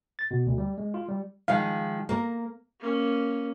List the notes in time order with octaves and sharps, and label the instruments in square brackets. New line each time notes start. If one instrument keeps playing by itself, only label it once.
[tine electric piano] A6
B2
D2
G3
G#3
F4
G3
[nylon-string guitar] D#3 F3 G#3 [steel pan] F5
[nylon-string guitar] A#3 A#4
[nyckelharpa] A#3 C#4